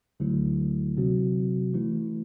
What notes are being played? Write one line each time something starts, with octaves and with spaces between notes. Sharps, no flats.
D2 D3 F#3 A3 E4
C3 F#3 C4 F#4
E3 A3 E4